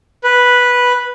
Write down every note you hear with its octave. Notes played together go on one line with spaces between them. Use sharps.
B4